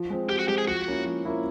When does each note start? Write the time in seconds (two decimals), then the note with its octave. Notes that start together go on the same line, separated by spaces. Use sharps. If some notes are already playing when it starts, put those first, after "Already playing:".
Already playing: F3
0.10 G#3 C4
0.29 F3 G4
0.39 F#4
0.48 G#3 C4 G4
0.58 G#4
0.67 F3 F#4
0.87 A#3 C#4 E4
1.05 F3
1.25 A#3 C#4 E4